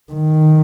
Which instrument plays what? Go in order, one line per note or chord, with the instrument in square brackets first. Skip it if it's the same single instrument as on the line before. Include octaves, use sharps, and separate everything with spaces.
[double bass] D#3